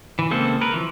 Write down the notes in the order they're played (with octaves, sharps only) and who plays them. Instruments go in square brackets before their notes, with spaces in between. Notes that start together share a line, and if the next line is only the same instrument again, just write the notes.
[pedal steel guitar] E3
C#3 G#3 A#3 C4 A4
A#4 B4
E3 F3